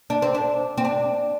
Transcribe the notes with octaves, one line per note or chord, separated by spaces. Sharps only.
D4
C4
D4
C4
D4